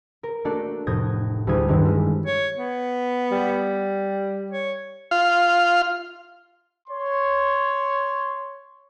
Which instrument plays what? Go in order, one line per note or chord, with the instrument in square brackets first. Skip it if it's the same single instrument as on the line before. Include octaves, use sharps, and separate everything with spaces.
[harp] A#4
A3 A#3 D4 F#4 A4 D5
F1 A2 D#6 G6 G#6 A#6
D2 G3 G#3 E4 D#6 G#6
G2 D#3 C4 D4 E4 F#4
G3 G#3
[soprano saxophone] C#5
B3
[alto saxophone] G3
[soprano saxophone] C#5
[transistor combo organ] F4 F5
[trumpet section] C#5 C6